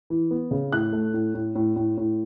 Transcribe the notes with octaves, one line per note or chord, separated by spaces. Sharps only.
E3
B3
C#3
A2 F#6
A3
A2
A2
A2
A2
A2